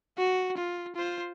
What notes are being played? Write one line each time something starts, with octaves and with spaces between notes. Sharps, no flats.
F#4
F4
F4 C5